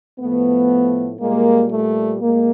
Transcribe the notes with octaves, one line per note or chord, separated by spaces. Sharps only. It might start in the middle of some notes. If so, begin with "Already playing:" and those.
A2 F3 A3 B3
A#2 G3 G#3 A#3
A3
A2 G#3 A#3